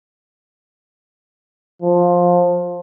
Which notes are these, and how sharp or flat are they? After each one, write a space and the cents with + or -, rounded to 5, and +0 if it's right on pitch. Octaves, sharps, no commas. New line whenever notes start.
F3 +15